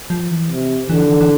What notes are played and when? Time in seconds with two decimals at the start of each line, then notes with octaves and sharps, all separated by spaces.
0.10 F3
0.31 E3
0.51 C3
0.90 D3 E3
1.00 F3
1.10 E3
1.21 E3